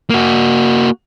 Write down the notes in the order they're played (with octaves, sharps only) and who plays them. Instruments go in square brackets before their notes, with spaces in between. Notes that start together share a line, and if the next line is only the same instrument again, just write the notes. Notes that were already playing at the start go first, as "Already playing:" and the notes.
[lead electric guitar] A#3 F#4